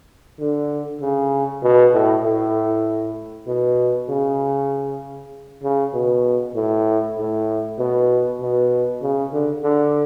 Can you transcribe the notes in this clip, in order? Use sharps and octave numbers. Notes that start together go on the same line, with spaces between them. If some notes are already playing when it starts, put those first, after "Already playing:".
D3
C#3
B2
A2
A2
B2
C#3
C#3
B2
A2
A2
B2
B2
C#3
D3
D3